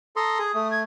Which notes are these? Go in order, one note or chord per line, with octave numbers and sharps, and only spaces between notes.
A4 A#5 C6 D#6
G#4
A3
G#6